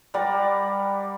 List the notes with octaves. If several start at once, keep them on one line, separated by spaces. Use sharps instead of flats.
G3 A#4 D5 F#5